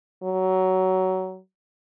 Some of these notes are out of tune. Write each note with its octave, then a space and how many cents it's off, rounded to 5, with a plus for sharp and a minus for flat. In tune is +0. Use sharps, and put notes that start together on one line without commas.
F#3 +15